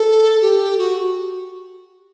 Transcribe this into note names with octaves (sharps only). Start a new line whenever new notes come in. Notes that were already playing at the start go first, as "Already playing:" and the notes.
Already playing: A4
G4
F#4